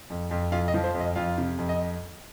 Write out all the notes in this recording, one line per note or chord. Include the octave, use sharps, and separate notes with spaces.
F2
F2
F2 F4 F5
D#5
F3
C5
F2
D#5
F2 F4 F5
C3
F2
D#5